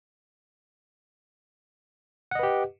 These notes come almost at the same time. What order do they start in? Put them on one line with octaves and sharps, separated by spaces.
F#5 D#5 B4 G4